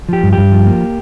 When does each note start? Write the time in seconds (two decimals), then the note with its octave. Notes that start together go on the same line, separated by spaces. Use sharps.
0.09 F3 G4
0.23 G2
0.33 G4
0.38 G2
0.52 F3
0.66 A#3